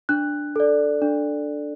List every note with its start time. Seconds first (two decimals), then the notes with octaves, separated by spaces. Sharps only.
0.09 D4 F#6
0.56 A4 D5
1.02 D4